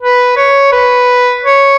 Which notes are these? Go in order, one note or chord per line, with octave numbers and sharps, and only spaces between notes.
B4
C#5
B4
C#5